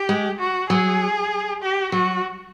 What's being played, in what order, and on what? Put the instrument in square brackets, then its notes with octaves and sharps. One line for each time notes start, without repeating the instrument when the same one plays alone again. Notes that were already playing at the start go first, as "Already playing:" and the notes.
Already playing: [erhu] G4
[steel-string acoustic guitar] G#3
[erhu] F#4
[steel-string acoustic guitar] F#3 [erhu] G#4
[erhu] G4
[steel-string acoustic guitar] F#3 [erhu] F#4